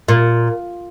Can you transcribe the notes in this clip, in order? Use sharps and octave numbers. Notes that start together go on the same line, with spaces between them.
A#2